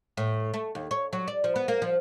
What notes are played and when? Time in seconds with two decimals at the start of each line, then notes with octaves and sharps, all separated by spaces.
0.17 A2
0.54 A3
0.75 D#2
0.91 C#5
1.13 F#3
1.28 D5
1.44 F3
1.56 B3
1.68 A#3
1.82 F3